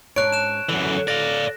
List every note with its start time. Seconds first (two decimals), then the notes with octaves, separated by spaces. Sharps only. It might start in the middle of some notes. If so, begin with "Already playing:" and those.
0.16 G#2 C#4 D4 C#5 F#6 D7
0.32 F#6 E7
0.69 F#2 D3 E3
1.08 D5 F5 A#6